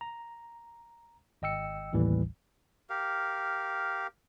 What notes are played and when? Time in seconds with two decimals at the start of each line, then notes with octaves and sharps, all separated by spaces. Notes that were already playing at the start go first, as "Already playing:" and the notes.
0.01 A#5
1.42 G#1 D#5 G5 E6 C#7
1.93 A1 D#2 A2 E3 G3
2.90 G4 A#4 F5